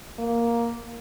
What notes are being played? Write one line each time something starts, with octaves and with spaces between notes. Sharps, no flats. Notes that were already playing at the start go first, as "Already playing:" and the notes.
A#3